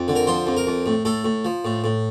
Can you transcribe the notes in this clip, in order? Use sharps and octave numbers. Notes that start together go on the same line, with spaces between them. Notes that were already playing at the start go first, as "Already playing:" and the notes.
Already playing: F2
D3
A#4
F3 C5
F2
A#4
F2
A2
A2 A4
A2
F3
A2
A2